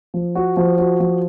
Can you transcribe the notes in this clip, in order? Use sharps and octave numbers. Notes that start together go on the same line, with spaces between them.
F3
F#4
F3
F#4
F3